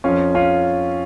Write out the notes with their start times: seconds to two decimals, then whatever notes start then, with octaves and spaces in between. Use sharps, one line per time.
0.04 F2 F3 C#4 F4
0.35 C#4 F4